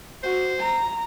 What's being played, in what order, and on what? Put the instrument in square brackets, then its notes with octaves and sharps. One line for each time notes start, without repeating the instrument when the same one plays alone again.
[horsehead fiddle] F#4 [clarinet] C5
[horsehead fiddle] A#5